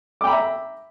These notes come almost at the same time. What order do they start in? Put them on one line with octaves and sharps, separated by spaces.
D6 G5 B5 A#5 E5